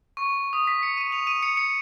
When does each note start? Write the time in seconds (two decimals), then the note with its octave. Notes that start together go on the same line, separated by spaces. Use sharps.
0.17 C#6
0.53 D#6
0.67 B6
0.83 C#7
0.97 D#7
1.12 F7
1.27 D#7
1.43 C#7
1.57 C#7